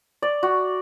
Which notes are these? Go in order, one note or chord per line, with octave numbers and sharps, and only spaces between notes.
D5
F#4